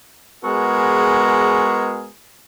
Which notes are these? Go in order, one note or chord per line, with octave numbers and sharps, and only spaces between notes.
G#3 B3 F#4 G#4 A#4